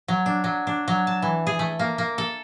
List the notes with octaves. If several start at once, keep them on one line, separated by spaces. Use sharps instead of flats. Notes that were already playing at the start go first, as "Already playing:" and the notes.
F#3
D4
F#3
D4
F#3
A5
E3
G#4
A3
A#3
A#3
A4